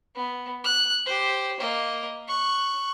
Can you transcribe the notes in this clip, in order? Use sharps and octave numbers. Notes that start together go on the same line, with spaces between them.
B3
F#6
G4 C5
A#3 D#5
C#6 F#6